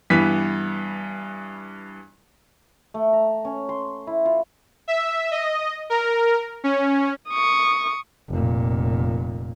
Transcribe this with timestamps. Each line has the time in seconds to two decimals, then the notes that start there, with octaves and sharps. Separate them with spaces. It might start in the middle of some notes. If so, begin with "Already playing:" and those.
0.10 G2 E3 B3 B6
2.94 A3
3.13 A#5
3.45 C#4
3.69 C6
4.07 E4
4.25 F4
4.88 E5
5.31 D#5
5.90 A#4
6.64 C#4
7.30 C#6 D#6
8.29 F1 A#2